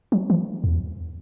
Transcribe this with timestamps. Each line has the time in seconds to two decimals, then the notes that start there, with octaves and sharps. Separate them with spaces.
0.12 F#3
0.30 E3
0.64 E2